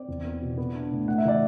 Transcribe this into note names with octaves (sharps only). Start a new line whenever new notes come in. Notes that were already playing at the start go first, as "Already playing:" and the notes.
Already playing: C4 D5
E2
B3
B2
B3
D4
A2
A3 F#5
E5
E3 D5